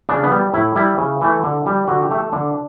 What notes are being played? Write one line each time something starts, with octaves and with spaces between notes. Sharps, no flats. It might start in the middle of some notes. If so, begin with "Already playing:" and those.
C#3 D4
B3
G3
A2 E4
G3 E4
C#3
E3 A3
D3
G3
D3 F#4
G4
A3
A4
D3 D4